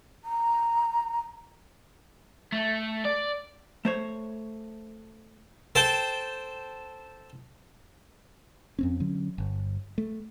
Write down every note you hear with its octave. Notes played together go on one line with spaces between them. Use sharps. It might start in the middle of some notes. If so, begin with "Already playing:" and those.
A#5
A3
D5
A3 C5 C#5
A4 C5 G5 A5
F2 C4 C#4
D3 F#3 C#4
G1
A3